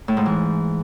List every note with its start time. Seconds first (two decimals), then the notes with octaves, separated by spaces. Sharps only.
0.08 A2
0.17 G#2
0.26 E3